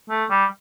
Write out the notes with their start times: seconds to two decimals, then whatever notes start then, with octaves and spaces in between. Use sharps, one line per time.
0.10 A3
0.30 G3